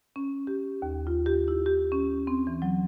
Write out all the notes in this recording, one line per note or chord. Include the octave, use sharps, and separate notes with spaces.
C#4
G4
D#2
F4
G4
E4
G4
C#4
C4
E3
F#3